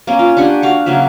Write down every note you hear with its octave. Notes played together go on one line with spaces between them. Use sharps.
A#3 C#4
F4
D4 G4 F#5 G#5
F#4 F5 F#5
C#3 F#3 A#3 E5